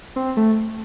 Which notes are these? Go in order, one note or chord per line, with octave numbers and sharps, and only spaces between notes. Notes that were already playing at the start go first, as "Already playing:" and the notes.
C4
A3